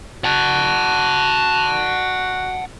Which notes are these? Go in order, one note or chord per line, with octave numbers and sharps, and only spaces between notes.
F#4 F#5 A5